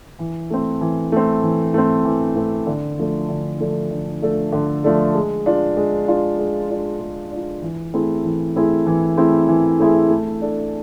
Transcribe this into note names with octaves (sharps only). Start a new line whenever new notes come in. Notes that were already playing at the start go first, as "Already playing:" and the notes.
E3
A3 C4
E3
A3 C4
E3
A3 C4
E3
A3 C4
D3
F3 A3 D4 A4
D3
F3 A3 D4 A4
D3
F3 A3 D4 A4
D3
F3 A3 D4 A4
G#3
D4 F4
G#3
D4 F4
G#3
D4 F4
G#3
D4
F4
E3
A3 C4 E4 G#4
E3
A3 C4 E4 G#4
E3
A3 C4 E4 G#4
E3
A3 C4 E4 G#4
A3
D4 A4